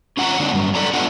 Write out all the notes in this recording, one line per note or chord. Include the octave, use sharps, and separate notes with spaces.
C#4 F4 F#5 G#5 A#5
D3 F#3 A#3 C4 D4 D#4
G2 F#3
A4 D5 A#5
A3 B3 D4 F4 F#5